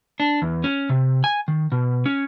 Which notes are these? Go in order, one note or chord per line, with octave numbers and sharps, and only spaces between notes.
D4
E2
C#4
C3
G#5
D#3
B2
C#4